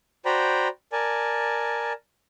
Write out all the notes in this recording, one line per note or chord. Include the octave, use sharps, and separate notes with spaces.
F#4 C5 D5 G5 A#5 B5
A#4 D5 G#5 A5